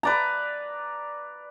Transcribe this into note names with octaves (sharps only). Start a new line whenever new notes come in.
B4 D5 A#5